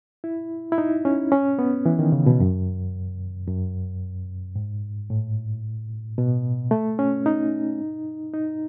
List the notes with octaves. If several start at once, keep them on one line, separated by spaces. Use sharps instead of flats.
E4
E4
D#4
C#4
C#4
B3
E3
D#3
C#3
B2
F#2
F#2
G#2
A2
B2
A3
C#4
D#4
D#4